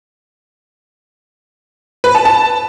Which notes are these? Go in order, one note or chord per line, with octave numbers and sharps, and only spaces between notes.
B4
A5
A5